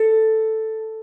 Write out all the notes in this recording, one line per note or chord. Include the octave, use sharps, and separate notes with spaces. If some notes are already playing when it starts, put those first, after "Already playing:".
Already playing: A4